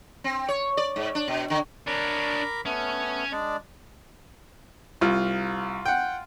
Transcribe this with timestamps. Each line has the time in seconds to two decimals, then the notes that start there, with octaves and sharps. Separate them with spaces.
0.24 C4
0.49 C#5
0.77 D5
0.96 G#2
1.15 D4
1.28 B2
1.50 D3
1.87 D4 A#4 C#5 B5 D6
2.66 A3 B3 C#4
3.32 G#3 D4 D5
5.01 C2 F4
5.85 F#5 G5